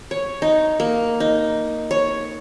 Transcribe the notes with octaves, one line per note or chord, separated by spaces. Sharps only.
C#5
D#4
A#3
D#4
C#5